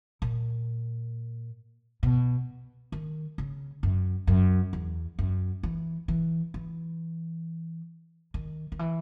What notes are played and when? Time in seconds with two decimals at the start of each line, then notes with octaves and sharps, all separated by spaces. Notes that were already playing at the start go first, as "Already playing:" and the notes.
0.22 A#2
2.03 B2
2.92 D#3
3.38 C#3
3.83 F#2
4.27 F#2
4.73 E2
5.19 F#2
5.63 E3
6.08 E3
6.54 E3
8.34 D#3
8.72 D#3
8.79 E3